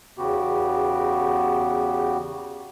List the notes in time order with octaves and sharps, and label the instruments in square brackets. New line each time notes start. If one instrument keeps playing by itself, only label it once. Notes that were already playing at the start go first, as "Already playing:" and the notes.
[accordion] E2 C#3 B3 F#4 G4